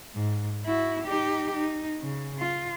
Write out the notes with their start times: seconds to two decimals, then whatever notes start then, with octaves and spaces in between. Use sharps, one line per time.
0.14 G#2
0.65 E4 F#4
1.04 D#4 G4
1.54 D#4
2.00 C#3
2.39 F4